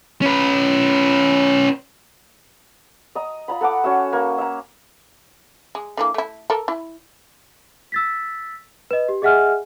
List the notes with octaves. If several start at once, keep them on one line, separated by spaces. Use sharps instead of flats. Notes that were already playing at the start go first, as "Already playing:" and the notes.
C#4 B4
D#5 A#5
F4 A#5 B5
A4 F#5 D6
C#4 F#4 E5
A#3
E5 A#5
G#3
D3 E3 A#3
A3 E4
A4 A#4
E4
E6 A6 B6
B4 D#5
G4
G#4 D#5 E5 F#5 G#5 F6